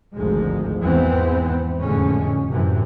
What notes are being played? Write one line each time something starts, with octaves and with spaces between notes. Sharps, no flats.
G#1 D2 G#2 F3 G#3
E2 G#2 E3 B3 C4
F1 A2 D3 G#3 C#4
F#2 A2 C3 E3